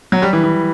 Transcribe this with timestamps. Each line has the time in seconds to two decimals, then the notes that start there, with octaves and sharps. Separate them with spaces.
0.12 F#3
0.22 G3
0.33 E3
0.44 E3